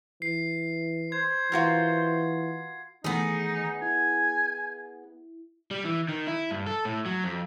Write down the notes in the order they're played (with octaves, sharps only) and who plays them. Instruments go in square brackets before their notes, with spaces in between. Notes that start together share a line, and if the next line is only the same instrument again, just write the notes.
[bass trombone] E3 [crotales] C7
[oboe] C5 [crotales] G#6
[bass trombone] E3 [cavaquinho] F4 F#4 A#4
[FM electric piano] D#3 E3 A3 [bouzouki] B3 G#4 [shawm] D#4
[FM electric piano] E4 [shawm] G#5
[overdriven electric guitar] G3
E3
D#3
E4
G2
A4
A2
F#3
F2